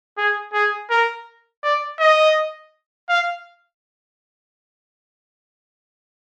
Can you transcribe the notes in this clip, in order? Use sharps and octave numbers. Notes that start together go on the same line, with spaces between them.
G#4
G#4
A#4
D5
D#5
F5